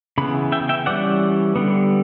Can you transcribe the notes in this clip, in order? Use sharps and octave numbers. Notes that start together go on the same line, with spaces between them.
C#3 E3 B3 B5
E5 G5
E5 G5
E3 G3 C#4 D5 F#5
D3 G3 B3